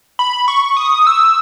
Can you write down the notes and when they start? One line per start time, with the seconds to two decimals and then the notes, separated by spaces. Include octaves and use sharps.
0.19 B5
0.48 C#6
0.77 D#6
1.07 E6